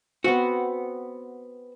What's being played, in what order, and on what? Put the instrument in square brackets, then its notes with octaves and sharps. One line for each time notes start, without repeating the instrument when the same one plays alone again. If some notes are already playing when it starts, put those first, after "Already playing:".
[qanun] B3 C4 [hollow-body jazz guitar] F#4